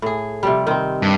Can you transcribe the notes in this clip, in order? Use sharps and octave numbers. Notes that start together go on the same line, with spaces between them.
A2 G#4
C3 F3 G3
D#3 C4
G2